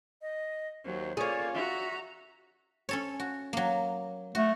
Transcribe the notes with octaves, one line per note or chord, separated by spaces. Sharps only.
D#5
D#2 F#3 C5
A#3 C#4 F4 G#4 C#5 D5
F#4 E5 A#5
C#4 A4 C#5
F#4
F#3 A#3
A3 F#4